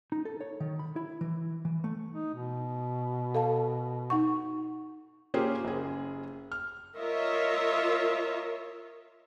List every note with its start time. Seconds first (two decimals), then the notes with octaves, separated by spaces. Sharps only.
0.12 D#4
0.25 A4
0.41 C#5
0.60 D#3
0.79 B5
0.96 E4
1.21 E3
1.65 E3
1.84 A3
2.12 D#4
2.34 B2
3.35 A4 F5 A5
4.10 D#4 F#5 C#6
5.34 A#3 C#4 F4 G4 G#4 C5
5.64 F#1 G#4
6.52 F6
6.97 F4 A#4 C#5 D#5 E5